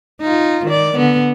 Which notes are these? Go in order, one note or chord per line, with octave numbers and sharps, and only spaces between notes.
D#4 F4
D#3 D5
D3 B3